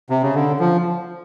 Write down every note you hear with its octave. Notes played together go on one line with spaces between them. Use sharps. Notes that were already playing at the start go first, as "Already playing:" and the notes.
C3
C#3
D3
F3